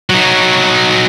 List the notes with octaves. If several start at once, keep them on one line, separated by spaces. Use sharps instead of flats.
F#3 D#4